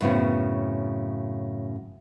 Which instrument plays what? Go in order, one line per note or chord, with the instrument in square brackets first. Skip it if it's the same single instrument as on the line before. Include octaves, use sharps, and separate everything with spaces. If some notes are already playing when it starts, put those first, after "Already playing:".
[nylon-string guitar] F#2 A2 C#3 B3 C4 F#4